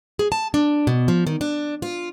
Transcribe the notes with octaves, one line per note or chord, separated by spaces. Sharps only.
G#4
A5
D4
B2
F3
D#3
D4
F4